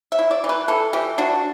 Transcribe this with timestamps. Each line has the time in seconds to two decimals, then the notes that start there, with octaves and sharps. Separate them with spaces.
0.12 E5
0.19 E4
0.31 D5
0.44 E3
0.49 B4
0.68 E3 A4
0.93 E3 G4
1.18 D4 F#4